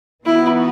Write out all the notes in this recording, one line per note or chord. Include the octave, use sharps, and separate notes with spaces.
E3 B3 D#4 E4 F#4